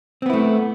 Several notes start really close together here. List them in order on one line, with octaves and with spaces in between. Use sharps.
C4 B3 E4 A3